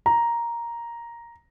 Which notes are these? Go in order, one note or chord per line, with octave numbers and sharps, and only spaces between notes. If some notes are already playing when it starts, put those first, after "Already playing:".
A#5